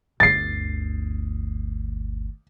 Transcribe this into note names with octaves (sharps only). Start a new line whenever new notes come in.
G1 D2 A6 C7